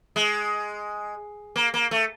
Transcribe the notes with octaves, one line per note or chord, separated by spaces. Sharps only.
G#3
A#3
A#3
A3